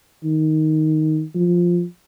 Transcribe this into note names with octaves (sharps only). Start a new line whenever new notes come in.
D#3
F3